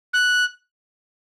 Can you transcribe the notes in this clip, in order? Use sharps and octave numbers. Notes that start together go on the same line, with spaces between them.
F#6